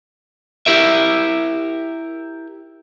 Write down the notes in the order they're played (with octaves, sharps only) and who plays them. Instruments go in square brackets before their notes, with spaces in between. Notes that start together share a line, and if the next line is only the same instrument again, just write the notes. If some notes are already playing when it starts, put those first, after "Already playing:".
[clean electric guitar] E4 G4 A#4 E5